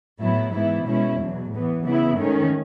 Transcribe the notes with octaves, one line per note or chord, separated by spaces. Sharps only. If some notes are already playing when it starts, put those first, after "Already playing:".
A2 F#3 B3 E4
G#2 E3 B3 E4
B2 G#3 C#4 E4
E2 B2 F#3
A2 E3 B3
C#3 E3 B3 E4
G#2 D#3 A3 C#4